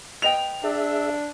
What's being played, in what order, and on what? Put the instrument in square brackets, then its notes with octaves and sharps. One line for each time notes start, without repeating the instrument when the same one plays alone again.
[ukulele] B4 D#5 G5 [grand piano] F7
[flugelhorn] D4 [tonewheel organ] G#4 E5 E6